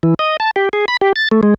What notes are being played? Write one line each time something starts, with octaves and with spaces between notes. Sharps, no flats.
E3
D#5
A5
G4
G#4
B5
G4
A6
A3
G#3